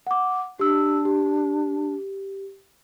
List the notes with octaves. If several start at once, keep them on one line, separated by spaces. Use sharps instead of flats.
F#5 D6
D4 G4 E6
G4